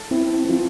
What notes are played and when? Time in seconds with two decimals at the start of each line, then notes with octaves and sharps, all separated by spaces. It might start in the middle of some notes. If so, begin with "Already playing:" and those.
Already playing: A4
0.11 C4 E4
0.49 F3 C4